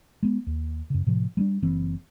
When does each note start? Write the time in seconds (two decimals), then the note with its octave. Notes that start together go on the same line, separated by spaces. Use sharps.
0.23 G#3 B3
0.47 D#2
0.90 F#2 C#3
1.07 A2 C3 F3
1.37 G3 A3 D4
1.62 F#1 E3 C4